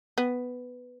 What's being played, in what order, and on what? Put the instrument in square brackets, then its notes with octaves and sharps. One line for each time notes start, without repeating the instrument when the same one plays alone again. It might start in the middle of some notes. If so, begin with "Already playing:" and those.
[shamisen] B3